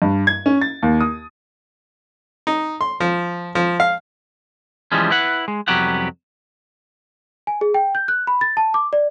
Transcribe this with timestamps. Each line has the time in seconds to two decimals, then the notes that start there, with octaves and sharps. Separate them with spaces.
0.02 G2
0.27 G#6
0.46 C#4
0.62 A6
0.83 D#2
1.01 D#6
2.47 D#4
2.81 C6
3.00 F3
3.55 F3
3.80 F5
4.92 E3 F3 G3 G#3 C#4
5.10 E4 B4 F#5
5.48 G#3
5.68 C2 F2 F#3 B3 G4 F#5
7.47 G#5
7.61 G#4
7.74 G5
7.95 G6
8.08 F#6
8.27 B5
8.41 A6
8.57 A5
8.74 D6
8.93 D5